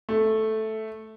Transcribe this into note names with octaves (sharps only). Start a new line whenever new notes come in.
A3